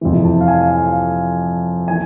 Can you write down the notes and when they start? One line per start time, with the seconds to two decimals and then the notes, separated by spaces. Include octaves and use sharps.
0.01 F2 C3 E3
0.25 A5
0.41 F5
0.48 G#5
0.71 F5
1.88 E3 G#5